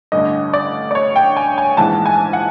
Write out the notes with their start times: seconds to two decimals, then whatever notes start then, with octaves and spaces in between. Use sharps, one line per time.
0.12 A1 G2 D3 D#5
0.53 D5
0.91 D5
0.95 C#5
1.16 G5
1.37 G#5
1.58 G#5
1.77 A#1 G#2 E3 A5
2.06 G#5
2.33 F#5